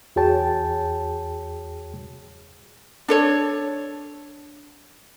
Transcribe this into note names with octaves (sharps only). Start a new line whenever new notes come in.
E2 F#4 G#4 C#5 G5 A5
D4 A4 C#5